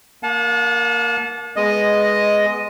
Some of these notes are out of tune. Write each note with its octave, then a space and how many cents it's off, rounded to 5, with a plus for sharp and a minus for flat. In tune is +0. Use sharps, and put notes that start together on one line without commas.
A#3 +0 F#5 -45 A5 -25
G#3 +5 B3 +0 D#5 +0